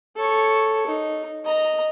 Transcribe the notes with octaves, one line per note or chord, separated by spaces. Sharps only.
A4 C#5
D#4
D#5 A#5